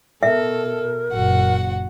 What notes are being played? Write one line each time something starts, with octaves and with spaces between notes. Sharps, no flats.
B2 A4 A#4 E5
F#1 A#2 F#4 F#5